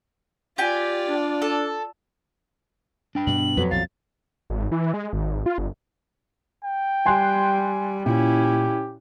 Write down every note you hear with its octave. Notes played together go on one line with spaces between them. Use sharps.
F4 G4 D5 G5 G#5
D4
A4
D4 G5 B5
G2 B2 B3 F#7
F2 F#3 B4
B1 E2 A#2 F5 A6
G#1
E3
G#3
G#1
F4
G1
G5
G3 G#5 C6 F#6
A#2 C#4 E4 G4